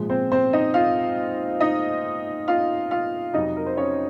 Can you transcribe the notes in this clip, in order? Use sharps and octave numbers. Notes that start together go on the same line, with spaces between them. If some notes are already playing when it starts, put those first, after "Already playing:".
Already playing: A#1 G#2 F3 G#3
C4 C5
C4 C5
D#4 D#5
F4 F5
D#4 D#5
F4 F5
F4 F5
F2 C3 F#3 D#4 D#5
A#4
C5
C#4 C#5